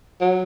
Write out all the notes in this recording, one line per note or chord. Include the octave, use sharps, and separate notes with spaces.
F#3